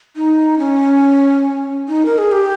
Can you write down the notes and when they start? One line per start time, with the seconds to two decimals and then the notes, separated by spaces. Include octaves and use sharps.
0.16 D#4
0.59 C#4
1.88 D#4
2.06 A#4
2.18 G#4
2.32 G4